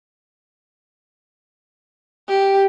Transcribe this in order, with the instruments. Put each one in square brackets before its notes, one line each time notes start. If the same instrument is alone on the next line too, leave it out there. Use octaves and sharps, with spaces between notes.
[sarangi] G4